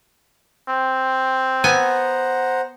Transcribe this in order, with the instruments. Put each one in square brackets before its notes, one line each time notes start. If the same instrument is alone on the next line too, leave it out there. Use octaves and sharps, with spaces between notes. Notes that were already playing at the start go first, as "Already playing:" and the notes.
[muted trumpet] C4
[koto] B3 G#5 [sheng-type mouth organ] C5 F#5 A#5